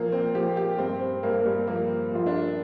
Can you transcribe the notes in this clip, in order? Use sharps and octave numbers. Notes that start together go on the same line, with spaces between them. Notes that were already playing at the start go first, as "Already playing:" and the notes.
Already playing: A#2 F3 A#3
C4
F3 G4
G4
G2 C4
C4
G2 A#3
A#3
G3
F3 A#3
F3 F4
D4